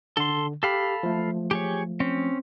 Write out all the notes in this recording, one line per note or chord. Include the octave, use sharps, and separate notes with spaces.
D3 A4 C6
G4 A4 F5 B5
F3 A3
G4 G#4 C#5
C4 C#4